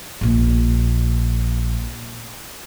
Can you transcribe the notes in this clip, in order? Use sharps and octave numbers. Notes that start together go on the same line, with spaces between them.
A#1 A#3